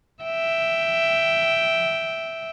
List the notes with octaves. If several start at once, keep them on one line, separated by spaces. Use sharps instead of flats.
E5 G5